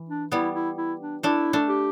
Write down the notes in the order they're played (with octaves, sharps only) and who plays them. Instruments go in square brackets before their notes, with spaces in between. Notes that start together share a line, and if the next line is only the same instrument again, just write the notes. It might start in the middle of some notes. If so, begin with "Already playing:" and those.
Already playing: [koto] E3
[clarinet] D4
[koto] G3 B3 [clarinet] E4
[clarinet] E4
E4
D4
[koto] A3 D4 [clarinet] E4
[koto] A3 D4
[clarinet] G4